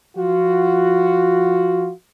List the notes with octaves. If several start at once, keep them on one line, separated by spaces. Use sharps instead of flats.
F3 F4 F#4